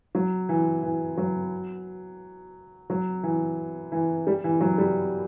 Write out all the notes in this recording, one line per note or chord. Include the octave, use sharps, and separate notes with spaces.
F#3
E3
E3
F#3
F#3
E3
E3
G3
E3
F#3
G3